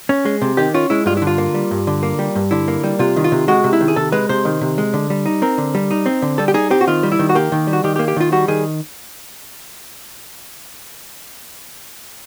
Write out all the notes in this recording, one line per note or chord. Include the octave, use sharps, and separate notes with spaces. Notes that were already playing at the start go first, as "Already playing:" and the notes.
C#4
G#3
C3
D#3 G4
C#4 F4
G#3 E4
G2 F4
E4
D3
F4
A#3
G3
G2
D3
A#3
G3
G2
D3 E4
A#3
G3
C3 F4
D#3
F4
C3
G#3 F#4
C3
E4
D#3
G#4
C3 A4
G#3 B4
C3 C5
D#3
C3
G#3
D3
G3
D#4
C4 A#4
D3
G3
D#4
C4
D3
G3 A4
G4
D#4 G#4
C4 G4
F#4
D#3 F4
G3
E4
D#3
F#4
A#3 G4
D#3
G3
F#4
D#3 G4
G4
A#3
G4
D#3 F4
G3 F#4
D#3 G#4